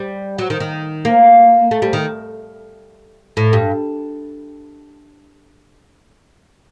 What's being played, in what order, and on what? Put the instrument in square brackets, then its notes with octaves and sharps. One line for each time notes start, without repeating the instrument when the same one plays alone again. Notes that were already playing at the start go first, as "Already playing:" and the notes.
Already playing: [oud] G3
F#3
D#3
D#3
A#3
A3
G3
D#3
A2
G2